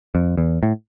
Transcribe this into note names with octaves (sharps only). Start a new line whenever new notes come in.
F2
E2
A2